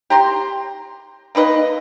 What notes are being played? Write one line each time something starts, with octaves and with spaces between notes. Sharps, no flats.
G4 A#5 C6
A#3 D#4 B4 D#5